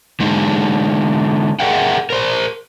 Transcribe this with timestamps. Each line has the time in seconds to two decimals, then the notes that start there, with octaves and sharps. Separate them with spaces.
0.20 D3 G#3 D#4
1.59 G#4 A#4 E5 F#5 G5
2.10 A#4 C5